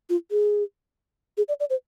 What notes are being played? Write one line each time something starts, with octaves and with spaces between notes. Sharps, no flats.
F4
G#4
G#4
D5
D5
C5